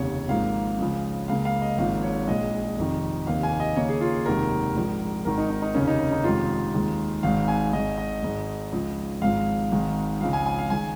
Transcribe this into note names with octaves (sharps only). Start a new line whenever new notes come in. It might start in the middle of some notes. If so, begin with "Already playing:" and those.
Already playing: F1 D#2 C#3 C#5
G#1 G#2 F3 A#3 F5
C#2 C#3 F3 G#3
C#2 C#3 A#3 F5
F5
D#5
G#1 G#2 F3 A#3 F5
C#5
A#1 A#2 G#3 D#5
F1 F2 D#3
F1 D#2 D#3 A#3 F5
G#5
D#5
D#2 C#3 A#3 C#5
G#4
F4
F1 D#2 D#3 G#3 A#4
A#1 G#2 F3
G#1 G#2 D#3 A#4
D#4
D#4
D#4
F1 D#2 C#3 A#3 C#4
D#4
D#4
F1 F2 D#3 G#3 F4
D#2 D#3 G#3
G#1 G#2 D#3 G#3 F5
G#5
G#1 G#2 G#3 D#5
D#5
G#1 G#2 G#3
C#2 C#3 F3
G#1 G#2 F3 G#3 F5
G#1 G#2 D#3 G#3
C#2 C#3 F3 G#3 F5
G#5
G#5
F5
D#3 G#3 G#5